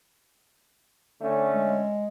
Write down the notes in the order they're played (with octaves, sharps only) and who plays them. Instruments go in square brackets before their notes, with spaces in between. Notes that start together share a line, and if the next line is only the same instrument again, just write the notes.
[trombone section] D3 A3 C#4
[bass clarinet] G#3